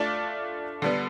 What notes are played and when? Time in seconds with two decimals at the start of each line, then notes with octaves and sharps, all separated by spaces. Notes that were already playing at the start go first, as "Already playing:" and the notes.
Already playing: A3 D4 F4 A4 D5
0.82 D3 G3 B3